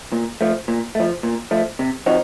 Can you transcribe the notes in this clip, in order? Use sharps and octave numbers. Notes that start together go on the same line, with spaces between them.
A#2
F3 A3
A#2
F3 A3
A#2
F3 A3
C3
F3 C4 D#4 F#4